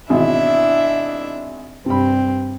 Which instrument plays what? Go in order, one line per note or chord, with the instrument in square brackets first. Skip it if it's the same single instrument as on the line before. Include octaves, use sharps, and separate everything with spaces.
[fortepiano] G#1 B2 E3 [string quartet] D4 E4 E5
[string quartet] G2 C4 [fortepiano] C3 B5